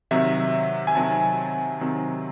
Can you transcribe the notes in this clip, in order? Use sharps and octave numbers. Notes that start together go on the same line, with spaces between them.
C3 D#3 F#3 C4 E5
G#5
C3 D#3 F#3 C4 A5
C3 D#3 F#3 C4